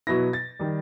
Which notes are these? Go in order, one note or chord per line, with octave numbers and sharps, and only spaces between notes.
B2 F#3 B3 E4 A#6
A6
D#3 G3